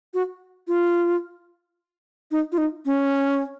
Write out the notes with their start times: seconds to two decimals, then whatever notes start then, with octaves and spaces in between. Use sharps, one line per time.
0.14 F#4
0.68 F4
2.31 D#4
2.52 F4
2.58 D#4
2.85 C#4